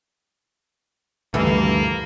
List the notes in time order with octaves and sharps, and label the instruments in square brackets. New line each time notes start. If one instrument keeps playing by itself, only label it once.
[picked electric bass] D2 G2 [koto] B2 E3 A4 [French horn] A#3